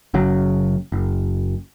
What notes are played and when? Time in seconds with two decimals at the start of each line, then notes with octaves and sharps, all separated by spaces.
0.14 F#1 C#3 F#3
0.92 F#1